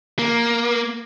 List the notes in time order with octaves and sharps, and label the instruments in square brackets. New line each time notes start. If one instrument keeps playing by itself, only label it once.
[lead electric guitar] A#3